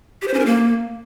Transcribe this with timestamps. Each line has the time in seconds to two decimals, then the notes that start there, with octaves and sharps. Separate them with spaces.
0.22 G4
0.28 C5
0.34 C#4
0.40 A#4
0.46 A#3